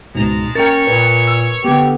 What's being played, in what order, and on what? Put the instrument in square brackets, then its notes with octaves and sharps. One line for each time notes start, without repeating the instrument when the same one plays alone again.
[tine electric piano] C#2 G#2 B2 [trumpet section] G#3 A5 A#5
[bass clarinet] C#4 [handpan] A#4 [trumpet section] C#5 [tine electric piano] G5 A6
[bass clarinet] A#2 [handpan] B4
[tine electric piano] E6
[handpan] D3 B3 [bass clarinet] G4